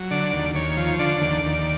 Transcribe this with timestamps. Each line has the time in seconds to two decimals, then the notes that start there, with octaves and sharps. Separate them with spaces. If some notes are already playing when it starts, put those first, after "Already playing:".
Already playing: F#3
0.11 D3 D5
0.33 D#2
0.55 D#2 C#5
0.77 F3
0.99 D3 D5
1.22 D#2
1.44 D#2